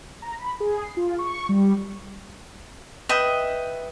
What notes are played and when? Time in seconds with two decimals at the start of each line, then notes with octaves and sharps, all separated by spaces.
0.22 A#5
0.39 B5
0.60 G#4
0.84 C7
0.97 F4
1.19 C#6
1.49 G3
3.09 B4 D#5 E5 G5